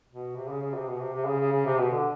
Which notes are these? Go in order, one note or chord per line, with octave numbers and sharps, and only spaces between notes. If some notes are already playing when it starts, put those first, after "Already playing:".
B2
C3
C#3
C#3
C3
B2
C3
C3
C#3
C#3
C#3
C3
B2
D3